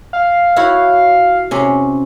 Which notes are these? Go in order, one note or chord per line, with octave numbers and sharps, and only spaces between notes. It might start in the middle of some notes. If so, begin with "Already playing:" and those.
F5
E4 F#4 C#5
C3 C#4